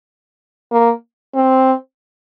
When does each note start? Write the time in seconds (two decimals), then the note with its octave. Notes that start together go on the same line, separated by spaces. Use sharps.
0.72 A#3
1.35 C4